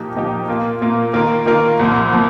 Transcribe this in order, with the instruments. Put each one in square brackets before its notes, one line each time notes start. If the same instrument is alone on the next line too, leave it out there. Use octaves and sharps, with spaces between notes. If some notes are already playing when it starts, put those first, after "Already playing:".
Already playing: [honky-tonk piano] A#2 F3 D#4 G4
A#2 F3 D#4 G4
A#2 A#3 F4
A#2 A#3 F4
D#3 A#3 F4 A#4
D#3 A#3 F4 A#4
C2 A#2 F3
A#2 F3